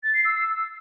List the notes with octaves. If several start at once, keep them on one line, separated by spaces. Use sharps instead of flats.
A6
C7
E6